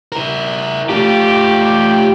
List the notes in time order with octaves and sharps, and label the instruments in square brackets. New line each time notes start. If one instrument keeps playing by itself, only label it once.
[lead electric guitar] E4 A#4
[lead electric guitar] A3 F4 [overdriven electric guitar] G4